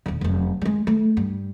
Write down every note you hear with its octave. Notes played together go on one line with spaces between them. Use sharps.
D#1 D3
F1 F#2
G3 G#3
A3
G2